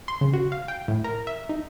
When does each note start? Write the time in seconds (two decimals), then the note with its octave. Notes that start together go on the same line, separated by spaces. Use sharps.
0.08 C6
0.21 C#3
0.33 F#4
0.52 F5
0.68 G5
0.88 A2
1.04 A#4
1.27 E5
1.49 D#4